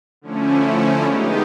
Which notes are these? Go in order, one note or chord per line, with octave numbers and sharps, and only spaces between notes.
D3 F3 A3 C#4 E4
G#3 B3 D#4 G4